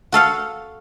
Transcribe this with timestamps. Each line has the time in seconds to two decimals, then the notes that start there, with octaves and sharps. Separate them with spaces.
0.12 F#4 A4 F5 F#5